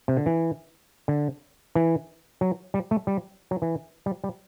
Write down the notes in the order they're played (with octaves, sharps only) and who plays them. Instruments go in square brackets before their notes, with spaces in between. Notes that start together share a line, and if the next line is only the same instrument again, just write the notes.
[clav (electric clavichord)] C3
D3
E3
D3
E3
F#3
G3
A3
G3
F#3
E3
G3
G3